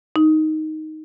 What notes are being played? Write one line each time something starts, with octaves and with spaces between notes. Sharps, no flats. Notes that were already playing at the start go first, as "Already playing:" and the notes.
D#4